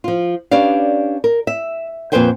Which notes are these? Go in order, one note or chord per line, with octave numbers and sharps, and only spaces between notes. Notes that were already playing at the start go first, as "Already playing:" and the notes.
F3 F4
C#4 D4 G4 B4 D5 F5
A#4
E5
F2 A#2 B4 C5 G5 G#5